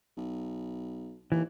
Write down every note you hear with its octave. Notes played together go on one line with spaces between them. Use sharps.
B1
D#2 E3